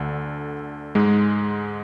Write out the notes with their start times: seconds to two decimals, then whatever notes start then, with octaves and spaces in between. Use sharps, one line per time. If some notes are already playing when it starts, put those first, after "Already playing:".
Already playing: D2 D3
0.95 G#2 G#3